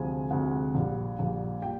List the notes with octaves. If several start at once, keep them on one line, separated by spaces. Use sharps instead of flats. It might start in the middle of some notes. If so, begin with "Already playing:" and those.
Already playing: D2 C3 F3 G#3 G#5
D2 C3 F3 G#3 F#5
A#1 A#2 G3
A#1 A#2 G3
A#2 G3 G5